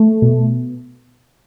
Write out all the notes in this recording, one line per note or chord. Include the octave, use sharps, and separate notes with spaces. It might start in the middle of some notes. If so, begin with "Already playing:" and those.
Already playing: A3
B2